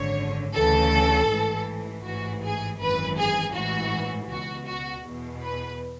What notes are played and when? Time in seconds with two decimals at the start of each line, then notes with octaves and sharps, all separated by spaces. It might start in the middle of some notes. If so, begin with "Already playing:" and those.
Already playing: G#1 F#2 D3 C#5
0.54 D2 C#3 E3 A4
1.29 A1 G#2 E3
2.04 A1 G#2 E3 F#4
2.42 G#4
2.79 G#1 F#2 E3 B4
3.17 G#4
3.54 A1 G#2 E3 F#4
4.29 C#2 B2 F#4
4.68 F#4
5.04 E2 B2
5.43 B4